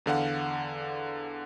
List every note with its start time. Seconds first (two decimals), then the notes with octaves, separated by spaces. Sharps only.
0.06 E2 D3 F5 F#5